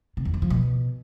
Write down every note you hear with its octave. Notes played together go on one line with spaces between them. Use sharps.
C3
E2
E3
F3
B2